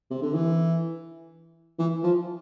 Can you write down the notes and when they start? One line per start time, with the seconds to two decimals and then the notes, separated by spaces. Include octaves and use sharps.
0.10 C3
0.22 D3
0.34 E3
1.79 E3
2.03 F3